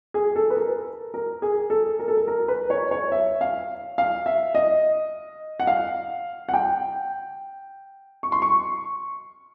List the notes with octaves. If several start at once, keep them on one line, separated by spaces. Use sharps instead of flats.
G#4
A4
B4
A#4
A#4
G#4
A4
A#4
A4
A#4
A#4
B4
C#5
C#5
E5
F5
F5
E5
D#5
F#5
F5
F#5
G5
C#6
C6
C#6